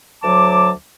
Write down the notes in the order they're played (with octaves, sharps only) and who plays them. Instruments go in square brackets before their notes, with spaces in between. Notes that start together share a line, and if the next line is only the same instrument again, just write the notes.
[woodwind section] D2 F#3 A5 D6